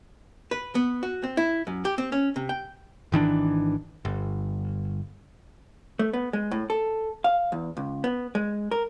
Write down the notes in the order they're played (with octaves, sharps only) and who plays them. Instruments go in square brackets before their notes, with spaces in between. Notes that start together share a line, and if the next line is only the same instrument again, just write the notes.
[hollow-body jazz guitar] B4
B3
F#4
C4
E4
F#2
G4
C4
C#4
C3
G5
[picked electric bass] G#1 D#3 E3 D4
G1
[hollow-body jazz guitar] A3
B3
G#3
A2
A4
F5
E2
C#2
B3
G#3
A#4